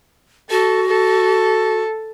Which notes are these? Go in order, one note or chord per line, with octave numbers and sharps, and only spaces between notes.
F#4 A4
A4